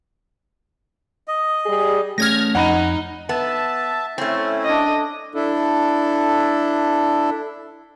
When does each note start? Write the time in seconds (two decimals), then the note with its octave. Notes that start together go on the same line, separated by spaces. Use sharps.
1.28 D#5
1.66 G3 G#4
2.18 A3 C#4 A4 F6 G#6 A#6
2.55 F2 D#4 F#5 B5 D#7
3.29 B3 E5 A5
4.18 A3 C4 C#4 E4
4.64 D4 D#5
5.35 D4 E4 A4